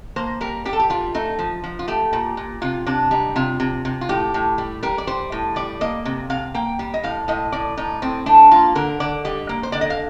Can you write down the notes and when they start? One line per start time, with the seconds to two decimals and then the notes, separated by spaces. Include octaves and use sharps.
0.16 A#3 C5
0.41 G3 A#4
0.65 G3 G4
0.73 A4
0.79 G4
0.90 G3 F4
1.14 A3 D#4
1.39 F3
1.64 F3
1.79 F4
1.88 A3 G4
2.13 A#2
2.37 A#2
2.62 C3 F4
2.87 C3 D4
3.11 G3 D#4
3.36 C3 F4
3.60 C3
3.85 C3
4.01 F4
4.09 A2 G4
4.34 A2
4.58 G3
4.83 G3 A#4
4.98 D5
5.07 G3 C5
5.32 A2
5.56 G3 D5
5.81 A#3 D#5
6.05 C3
6.30 C3 F5
6.54 A#3 G5
6.79 G3
6.94 D#5
7.03 A2 F5
7.28 A2 D#5
7.52 A2 D5
7.77 A2 D#4
8.02 A2 C4
8.26 A3 D4
8.51 A#3 F4
8.75 D3 A#4
9.00 D3 D5
9.25 G3 D#5
9.49 A#3
9.63 C5
9.72 D3 D5
9.81 D#5
9.90 F5